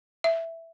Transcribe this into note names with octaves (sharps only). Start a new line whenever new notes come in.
E5